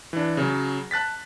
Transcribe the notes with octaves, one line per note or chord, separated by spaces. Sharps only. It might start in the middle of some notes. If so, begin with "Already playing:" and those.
E3 D4
C#3 F#3
A5 F#6 A6 B6